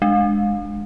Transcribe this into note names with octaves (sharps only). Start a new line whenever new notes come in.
G#3